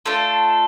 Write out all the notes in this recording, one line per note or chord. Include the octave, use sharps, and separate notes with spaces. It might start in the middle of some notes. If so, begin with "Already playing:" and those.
A3 D4 F4 A4